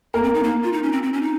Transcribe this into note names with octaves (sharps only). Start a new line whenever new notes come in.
A#3 A#4
C4
D#4
A#3
F4
D#4
C#4
C4
C4
C#4
D#4